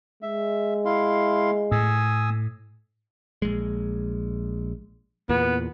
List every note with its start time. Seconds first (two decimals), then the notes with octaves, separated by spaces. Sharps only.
0.23 G#3 E5
0.85 E4 F5 C6
1.72 A2 G#5 D#6 E6
3.42 A#1 G#3
5.29 E2 A#2 B3